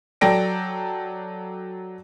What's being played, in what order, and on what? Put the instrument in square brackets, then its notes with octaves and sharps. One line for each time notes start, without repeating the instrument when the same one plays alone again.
[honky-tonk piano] F#3 A4 D5 G5 A#6 D7